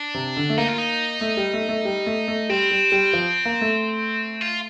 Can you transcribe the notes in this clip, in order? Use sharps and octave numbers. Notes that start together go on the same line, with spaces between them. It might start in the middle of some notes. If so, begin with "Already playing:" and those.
Already playing: D4
C3
D3
A3
A#3 D#4
F4
D#4
A3
G3
A3
A3
G3
A3
A3
G3 C4
G3
G3
F3
A#3
A3
F4